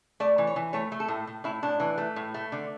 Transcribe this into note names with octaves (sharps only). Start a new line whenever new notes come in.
A3 D5
E3
C#5
E3
A3 C#5
A3
A4
A2
A2
A2 E4
A2 D4
E3
A3
A2
A3
D3